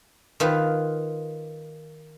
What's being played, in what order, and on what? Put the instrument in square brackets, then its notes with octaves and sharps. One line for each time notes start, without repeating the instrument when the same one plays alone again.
[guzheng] D#3 F4 B4